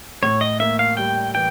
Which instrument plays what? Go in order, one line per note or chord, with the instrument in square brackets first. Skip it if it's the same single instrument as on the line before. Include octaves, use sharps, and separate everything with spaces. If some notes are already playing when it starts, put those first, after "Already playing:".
[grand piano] A2 [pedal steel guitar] C#5
[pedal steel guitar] D#5
[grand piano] A#3 [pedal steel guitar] E5
[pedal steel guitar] F5
[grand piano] G3 [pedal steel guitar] G5
[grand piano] E3 [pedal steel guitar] G5